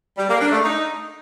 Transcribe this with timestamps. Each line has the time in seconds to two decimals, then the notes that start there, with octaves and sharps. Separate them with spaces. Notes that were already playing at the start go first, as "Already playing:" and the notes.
0.17 G3
0.29 A#3
0.40 D4
0.52 A3
0.63 D#4